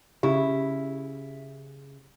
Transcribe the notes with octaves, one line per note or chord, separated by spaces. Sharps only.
C#3 E4 G4